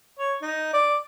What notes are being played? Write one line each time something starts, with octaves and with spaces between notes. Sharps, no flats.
C#5
D#4
D5